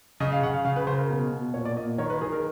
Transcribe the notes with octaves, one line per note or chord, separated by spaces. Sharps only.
C#3 D#5
F5
C#3 F#5
F5
C#3 F5
B4
C#3 C5
A#4
B2
B2
A#2 C#5
D5
A#2 D#5
D#3 C#5
B4
D#3 G#4
A#4